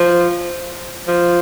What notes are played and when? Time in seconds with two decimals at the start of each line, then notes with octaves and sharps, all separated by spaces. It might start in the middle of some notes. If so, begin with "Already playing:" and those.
Already playing: F3
1.08 F3